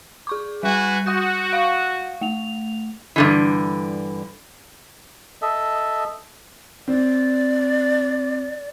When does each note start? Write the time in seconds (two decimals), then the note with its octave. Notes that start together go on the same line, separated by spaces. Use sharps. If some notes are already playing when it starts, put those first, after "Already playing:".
0.27 G#4 C#6 D6
0.63 G3 F#4 B4 G#5
1.06 F#4 F#5 D#6 G6
1.53 F5 C#6
2.21 A3 F7
3.16 G2 D3 E3
5.42 A4 D#5 E5
6.88 C4 D5